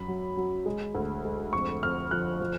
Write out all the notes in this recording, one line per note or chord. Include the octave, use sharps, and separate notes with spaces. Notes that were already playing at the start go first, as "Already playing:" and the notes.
Already playing: F#2 B5
F#3
F#3
G#3
D2
G#3
F2 C#6
F2 F6
F3 F#6
F3